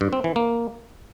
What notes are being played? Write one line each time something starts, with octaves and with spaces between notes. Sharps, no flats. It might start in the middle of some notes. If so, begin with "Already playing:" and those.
G2
C4
E3
A#3